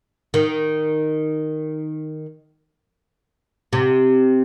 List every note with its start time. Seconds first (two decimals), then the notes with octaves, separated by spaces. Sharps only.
0.34 D#3
3.73 C3